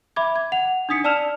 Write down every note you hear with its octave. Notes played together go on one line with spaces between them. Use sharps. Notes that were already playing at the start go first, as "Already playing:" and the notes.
E5 B5 D6 G#6
G#6
F#5 F7
D4 D#4 D#6 B6 C#7
D5 A5 E6 F6 E7 F7